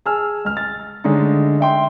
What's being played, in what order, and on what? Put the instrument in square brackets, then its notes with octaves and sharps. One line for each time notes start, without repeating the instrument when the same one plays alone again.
[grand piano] G#4 G#5 A5 E6 F6
C#2 F6
A6
D3 G#3 A3 C#4 D#4
E5 G5 C6